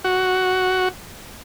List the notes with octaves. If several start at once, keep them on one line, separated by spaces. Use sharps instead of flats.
F#4